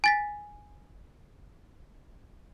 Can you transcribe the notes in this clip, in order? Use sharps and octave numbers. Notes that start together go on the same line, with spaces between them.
G#5 A6 B6